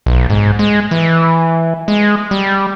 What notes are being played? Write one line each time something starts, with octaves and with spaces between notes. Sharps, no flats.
B1
G#2
G#3
E3
G#3
G3